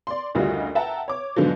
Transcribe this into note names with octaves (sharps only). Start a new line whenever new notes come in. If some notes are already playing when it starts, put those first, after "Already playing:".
D5 C6
F#1 D2 G3 F4 F#4 D#5
E5 F#5 G5 A5 A#5
C#5 D6
G#2 B2 D3 F3 F#3